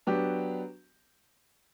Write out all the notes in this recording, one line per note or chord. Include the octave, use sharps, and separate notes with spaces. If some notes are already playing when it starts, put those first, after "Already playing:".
F#3 B3 D4 G4